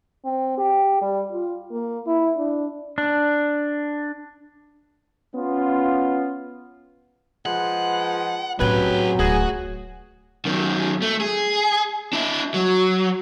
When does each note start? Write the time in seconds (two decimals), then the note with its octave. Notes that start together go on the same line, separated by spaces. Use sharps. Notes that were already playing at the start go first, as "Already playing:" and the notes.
0.25 C4
0.57 G4
1.01 G3
1.32 F4
1.71 A#3
2.06 E4
2.37 D4
2.98 D4
5.36 B3 C#4 F4
7.46 F3 G#3 B4 F#5
8.60 A2 C3 F#3 C#4 G#4 B4 G5
9.19 D1 F#4 G#4
10.45 F#2 D#3
11.02 A3
11.21 G#4
12.13 D4 E4
12.54 F#3